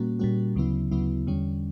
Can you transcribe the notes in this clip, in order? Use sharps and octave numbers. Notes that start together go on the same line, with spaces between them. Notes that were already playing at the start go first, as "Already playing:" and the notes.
Already playing: A#2 G3 A#3 C#4 F#4
A#2 G3 A#3 C#4 F#4
D2 C#3 F#3 B3 E4
D2 C#3 F#3 B3 E4
E2 D3 G3 C#4